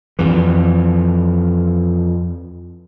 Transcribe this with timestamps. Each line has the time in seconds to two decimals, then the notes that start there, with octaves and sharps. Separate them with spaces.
0.19 F2 E3